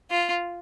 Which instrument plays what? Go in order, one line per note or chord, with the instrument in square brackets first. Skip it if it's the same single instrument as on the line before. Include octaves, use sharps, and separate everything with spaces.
[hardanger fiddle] F4